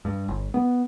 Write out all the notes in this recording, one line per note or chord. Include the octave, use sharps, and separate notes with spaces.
G2
G1
B3